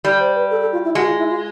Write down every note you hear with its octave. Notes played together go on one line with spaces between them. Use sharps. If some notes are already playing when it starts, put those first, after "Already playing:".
G3 D5
C5
B4
A4
A4
F4
E4
G#3 F#4
F4
E4
F4